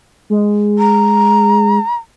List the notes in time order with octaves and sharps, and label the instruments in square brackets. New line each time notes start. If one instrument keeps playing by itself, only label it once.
[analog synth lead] G#3
[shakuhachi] A#5